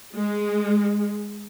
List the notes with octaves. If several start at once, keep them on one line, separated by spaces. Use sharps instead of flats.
G#3